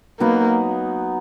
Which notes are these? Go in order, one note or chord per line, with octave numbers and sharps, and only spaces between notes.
F#3 A#3 B3 D#4